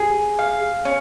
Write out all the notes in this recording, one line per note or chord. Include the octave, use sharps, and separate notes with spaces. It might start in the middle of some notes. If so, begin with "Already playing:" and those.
Already playing: G#4
F5
C#4